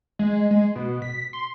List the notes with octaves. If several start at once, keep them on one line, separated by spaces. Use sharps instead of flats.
G#3
G#3
B2
B6
C6